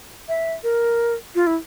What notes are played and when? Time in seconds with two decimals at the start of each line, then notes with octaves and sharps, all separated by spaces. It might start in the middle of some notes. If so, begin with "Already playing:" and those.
0.28 E5
0.64 A#4
1.35 F4
1.47 E4